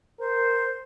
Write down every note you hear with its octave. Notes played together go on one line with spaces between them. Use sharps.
A#4 C5